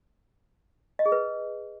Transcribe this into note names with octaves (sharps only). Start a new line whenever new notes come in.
D#5
G#4
B4